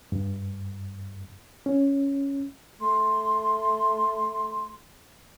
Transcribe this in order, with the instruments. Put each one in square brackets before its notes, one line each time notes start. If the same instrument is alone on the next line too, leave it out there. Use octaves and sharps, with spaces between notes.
[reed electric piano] G2
C#4
[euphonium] A3 [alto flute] C6